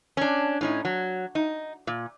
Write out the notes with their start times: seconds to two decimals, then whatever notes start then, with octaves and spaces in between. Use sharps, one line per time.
0.17 C#4 D4
0.61 A2 C#4 D#4
0.85 F#3
1.35 D#4
1.87 A#2